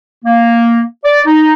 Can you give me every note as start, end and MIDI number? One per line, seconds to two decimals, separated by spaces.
0.25 0.80 58
1.05 1.21 74
1.26 1.53 63